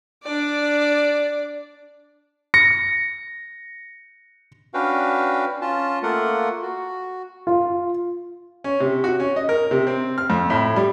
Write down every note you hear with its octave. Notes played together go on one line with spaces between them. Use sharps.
D4 D5
A#6 C#7
C#4 D4 F#4 B4 F5 G5
C#4 F4 A5
A3 A#3 F4 A#4 F#5
F#4
F4
C#4
C3
F#4
C#4
D#5
A#4
C3
C4
F6
F2
A2
G3